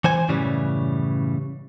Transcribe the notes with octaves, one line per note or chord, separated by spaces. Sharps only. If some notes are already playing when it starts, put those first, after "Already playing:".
E3 C5 G#5
F#2 A2 C#3 E3 G3